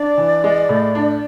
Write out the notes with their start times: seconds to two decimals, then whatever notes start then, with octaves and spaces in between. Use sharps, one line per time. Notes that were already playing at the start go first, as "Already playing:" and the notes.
Already playing: D4 D5
0.18 E3
0.44 G#3
0.69 A2
0.95 D4